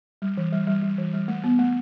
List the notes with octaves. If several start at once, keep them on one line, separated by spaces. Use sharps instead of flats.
G3
E3
G3
G3
G3
E3
G3
A3
B3
A3